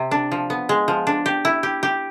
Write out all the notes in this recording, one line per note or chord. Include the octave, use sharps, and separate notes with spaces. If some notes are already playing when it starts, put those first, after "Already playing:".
Already playing: C3
D4
F3
B3
G#3
F3
D4
G4
E4
G4
G4